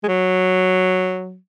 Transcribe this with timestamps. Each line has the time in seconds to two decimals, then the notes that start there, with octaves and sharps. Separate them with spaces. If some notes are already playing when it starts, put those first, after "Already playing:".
0.03 G#3
0.08 F#3